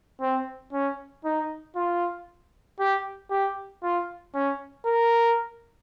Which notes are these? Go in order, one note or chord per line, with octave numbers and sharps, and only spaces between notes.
C4
C#4
D#4
F4
G4
G4
F4
C#4
A#4